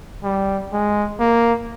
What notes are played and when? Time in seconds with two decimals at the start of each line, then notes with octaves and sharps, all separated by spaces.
0.24 G3
0.73 G#3
1.20 A#3